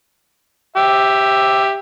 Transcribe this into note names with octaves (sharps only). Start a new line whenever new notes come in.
G4 E5